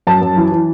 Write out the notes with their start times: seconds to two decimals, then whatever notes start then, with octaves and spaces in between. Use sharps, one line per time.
0.07 F#2 A5
0.22 F#2
0.37 E3
0.52 E3